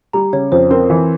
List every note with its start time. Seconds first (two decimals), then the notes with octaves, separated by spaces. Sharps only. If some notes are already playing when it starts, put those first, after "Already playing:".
0.13 G3 A#5
0.33 C#3 C#5
0.52 F2 C5
0.71 C4 A#4
0.90 E3